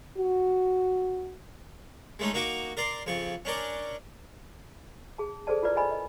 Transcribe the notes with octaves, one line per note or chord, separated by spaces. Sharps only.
F#4
G#3 A3 C#4 D#4
A#3 D#4 F#4 C#6 D6
A#4 D5 C6
F2 C#3 C#6
C#4 D4 A#4 D5
G#4 A5
G#4 A4 C5 D5 A5
E4 F4 A#4 B4 D5
D5 D#5 G#5 B5
D#5